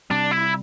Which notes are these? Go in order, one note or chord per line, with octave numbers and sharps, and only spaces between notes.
C3 G3 C4 D4
E4